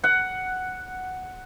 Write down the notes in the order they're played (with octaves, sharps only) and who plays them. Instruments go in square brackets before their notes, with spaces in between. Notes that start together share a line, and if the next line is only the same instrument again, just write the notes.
[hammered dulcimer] F#5